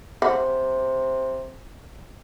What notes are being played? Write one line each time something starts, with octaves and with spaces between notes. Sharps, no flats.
C3 F#5